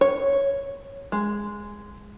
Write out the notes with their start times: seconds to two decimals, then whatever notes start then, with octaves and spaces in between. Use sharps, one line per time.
0.01 C#5
1.12 G#3